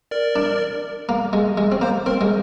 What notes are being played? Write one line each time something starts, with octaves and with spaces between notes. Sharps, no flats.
A#4 D5
D4
A#3
G#3
G#3
C4
A#3 C5
C4 A#4
G#3